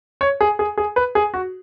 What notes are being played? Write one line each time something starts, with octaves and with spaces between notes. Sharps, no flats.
C#5
G#4
G#4
G#4
B4
G#4
F#4